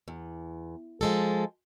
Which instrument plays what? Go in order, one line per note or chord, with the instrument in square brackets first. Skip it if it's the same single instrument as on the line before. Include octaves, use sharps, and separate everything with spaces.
[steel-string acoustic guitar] E2
F3 G#3 A4